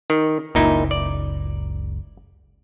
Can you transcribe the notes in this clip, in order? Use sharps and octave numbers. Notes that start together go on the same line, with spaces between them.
D#3
F#1 C#2 A#2 D#4 E4
D5